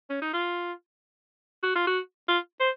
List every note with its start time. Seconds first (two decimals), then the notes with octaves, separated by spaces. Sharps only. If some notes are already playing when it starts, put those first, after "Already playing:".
0.10 C#4
0.22 D#4
0.33 F4
1.63 F#4
1.76 F4
1.87 F#4
2.28 F4
2.60 C5